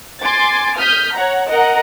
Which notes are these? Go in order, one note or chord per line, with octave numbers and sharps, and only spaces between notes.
G#5 C6 D6 A6
D#6 F6 G6 B6
C#5 F#5 A#5
A#4 D#5 F#5 A#5